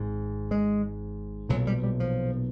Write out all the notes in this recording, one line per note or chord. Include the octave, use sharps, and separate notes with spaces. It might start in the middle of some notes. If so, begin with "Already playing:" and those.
Already playing: G#1 G#2
G#3
B1 A#2 F#3
G3
G3
F3